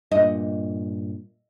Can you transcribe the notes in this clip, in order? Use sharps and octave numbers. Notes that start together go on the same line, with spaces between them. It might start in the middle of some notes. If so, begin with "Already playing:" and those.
G2 A#2 D#5